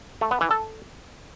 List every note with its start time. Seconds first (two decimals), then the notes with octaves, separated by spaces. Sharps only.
0.21 A3
0.31 B3
0.41 E3
0.51 A4